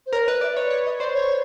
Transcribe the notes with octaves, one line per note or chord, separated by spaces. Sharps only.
C5
A#4 C#5
B4 D#5
D5 E5
C#5 D#5
C#5
D#5
C5 D5
C#5